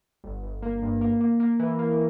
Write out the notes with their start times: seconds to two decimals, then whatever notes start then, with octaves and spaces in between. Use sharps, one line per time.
0.24 G1
0.43 G1
0.62 A#3
0.82 G2
1.01 A#3
1.21 A#3
1.40 A#3
1.59 E3
1.79 A#3